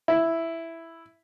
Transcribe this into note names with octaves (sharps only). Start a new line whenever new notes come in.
E4